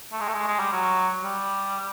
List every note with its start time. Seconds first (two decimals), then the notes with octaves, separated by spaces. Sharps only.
0.12 A3
0.20 G#3
0.28 A3
0.34 G#3
0.47 G#3
0.59 G3
0.72 F#3
1.23 G3